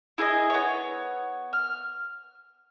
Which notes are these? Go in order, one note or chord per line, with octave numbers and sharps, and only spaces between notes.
E4 G#4 D5 D#5
B3 C#5
F6